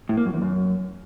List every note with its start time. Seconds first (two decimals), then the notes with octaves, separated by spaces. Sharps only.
0.09 A2
0.17 A#3
0.26 F#2
0.34 E2
0.42 F#2